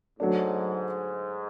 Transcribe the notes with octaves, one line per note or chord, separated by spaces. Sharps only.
G#2 F#3 A3 D4